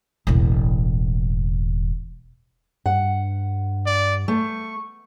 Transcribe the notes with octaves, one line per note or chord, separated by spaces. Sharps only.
E1 A1
G2 F#5
D5
A3 C#6